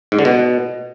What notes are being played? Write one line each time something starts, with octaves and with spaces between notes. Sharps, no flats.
G#2
D3
B2